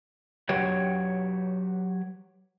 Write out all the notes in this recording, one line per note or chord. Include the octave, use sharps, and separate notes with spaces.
F#3 G4 B4 C#5